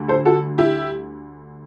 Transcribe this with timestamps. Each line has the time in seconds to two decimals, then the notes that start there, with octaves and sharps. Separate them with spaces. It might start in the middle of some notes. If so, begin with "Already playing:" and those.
Already playing: D2 D3 G3
0.08 A4 C5
0.25 F#4 A4
0.58 E4 G4